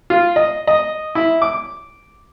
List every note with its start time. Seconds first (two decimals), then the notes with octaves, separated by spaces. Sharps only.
0.10 F4
0.36 D#5
0.67 D#5
1.15 E4
1.42 D6